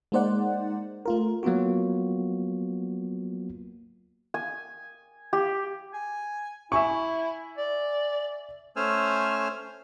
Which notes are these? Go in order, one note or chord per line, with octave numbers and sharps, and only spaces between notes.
G#3 A#3 D#4 C5 D5 F#5
A3 F4 A#4
F#3 A#3 B3 F4 F#4
G#5
G4
G#5
E4 E5 G#5 C#6
D5
A3 C#4 C5 G#5 E6 F6